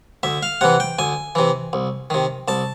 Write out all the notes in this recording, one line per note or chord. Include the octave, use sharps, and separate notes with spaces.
D2 E5
F5
C3 E3 F#5
G5
D2 G#5
C3 E3
C2
C3 D#3
C2 A5